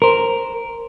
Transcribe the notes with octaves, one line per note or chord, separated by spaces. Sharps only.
A#4 C5